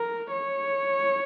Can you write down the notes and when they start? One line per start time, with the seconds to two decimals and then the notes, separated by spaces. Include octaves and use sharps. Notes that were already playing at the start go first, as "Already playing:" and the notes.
Already playing: A#4
0.31 C#5